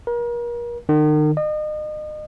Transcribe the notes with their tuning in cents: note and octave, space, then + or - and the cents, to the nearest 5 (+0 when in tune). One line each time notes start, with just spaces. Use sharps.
A#4 +35
D#3 -40
D#5 -35